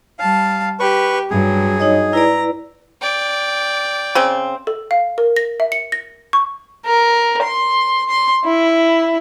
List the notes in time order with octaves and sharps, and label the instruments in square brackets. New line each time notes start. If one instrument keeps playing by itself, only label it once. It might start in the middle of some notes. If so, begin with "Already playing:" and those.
[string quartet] G3 A5 [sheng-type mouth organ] F5
[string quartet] G4 [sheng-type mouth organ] B4 C#6
[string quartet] G2 F#3 [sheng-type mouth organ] G#4
[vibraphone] D#4 C#5 D#5
[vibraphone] E4 B4 D5 [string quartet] A#5
[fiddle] D5 G5
[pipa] C#3 C4
[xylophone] A4
F5
A#4
A#6
E5
C#7
A#6
C#6
[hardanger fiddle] A#4
C6
C6
E4